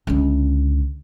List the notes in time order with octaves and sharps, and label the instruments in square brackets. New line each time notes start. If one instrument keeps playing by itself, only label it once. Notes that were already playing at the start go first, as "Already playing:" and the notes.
[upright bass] C#2 D3